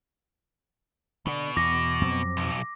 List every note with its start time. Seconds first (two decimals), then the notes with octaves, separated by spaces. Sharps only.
1.27 B2 D3
1.56 E2 D6 A#6
2.01 F2 F#3 C4
2.37 B1